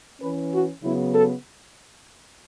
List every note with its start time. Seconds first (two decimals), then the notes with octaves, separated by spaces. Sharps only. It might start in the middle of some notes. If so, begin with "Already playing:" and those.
0.21 E3 C#4 B4
0.52 F#4
0.83 C#3 F#3 B3 E4
1.13 A4